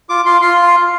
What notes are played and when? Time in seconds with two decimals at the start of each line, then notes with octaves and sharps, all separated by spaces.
0.09 F4 D6
0.25 F4 C6
0.42 F4 C6